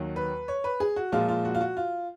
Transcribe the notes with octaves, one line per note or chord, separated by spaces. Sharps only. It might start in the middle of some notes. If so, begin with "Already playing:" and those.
Already playing: D#2 D#3 F#3
B4
C#5
B4
G#4
F#4
A#2 F3 G#3 F4
F4
F#4
F4
F#4
F4